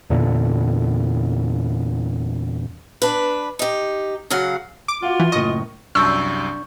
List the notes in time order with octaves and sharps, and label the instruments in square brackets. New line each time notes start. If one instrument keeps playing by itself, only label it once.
[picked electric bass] E2 A#2 D3
[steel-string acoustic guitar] D4 B4
D#4 G4
C#3 F#3 F5 F#5
[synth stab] D6
[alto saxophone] F4 [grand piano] F#4 F5 F#5
[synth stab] E3
[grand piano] F#1 A2 C#6 [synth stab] D#5
[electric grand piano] C2 F#2 G6 [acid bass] D4 [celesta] C#6 [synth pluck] E6